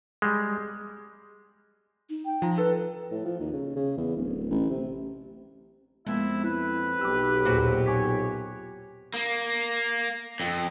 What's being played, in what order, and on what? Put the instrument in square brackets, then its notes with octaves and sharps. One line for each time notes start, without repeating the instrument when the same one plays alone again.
[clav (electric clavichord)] G3 G#3
[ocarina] D#4
[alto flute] G5
[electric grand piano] F3 A#5
[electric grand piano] A4 [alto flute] B4
[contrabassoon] A2
F3
D#2
C#3
C#3
E2
D1
A1
C3
[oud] F2 [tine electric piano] G#3 A#3 B3 [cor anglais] E4
[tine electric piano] E4 [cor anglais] B4
[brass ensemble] B1 G4 [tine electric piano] D6 E6
[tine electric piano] D#2 G#4 D6 [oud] A#2 C4 F#4
[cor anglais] C#5 [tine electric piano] G#5 D6 B6
[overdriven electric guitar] A#3
F2